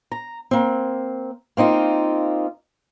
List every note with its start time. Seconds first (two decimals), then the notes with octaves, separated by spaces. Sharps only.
0.11 A#5
0.51 A#3 C4
1.57 A#3 C4 D#4 F4